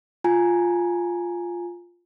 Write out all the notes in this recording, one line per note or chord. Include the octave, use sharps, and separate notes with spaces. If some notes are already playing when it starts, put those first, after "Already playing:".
F4 G#5 A#5